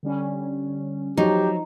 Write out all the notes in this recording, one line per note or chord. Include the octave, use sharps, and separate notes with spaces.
D3 G3 C#4
F3 F#3 D#4 G4